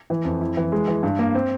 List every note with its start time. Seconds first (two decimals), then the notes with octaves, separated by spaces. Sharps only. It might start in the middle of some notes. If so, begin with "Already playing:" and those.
0.10 E3
0.25 F2
0.41 E4
0.57 E3
0.72 G#3
0.88 E3
1.03 G2
1.19 A#3
1.35 C4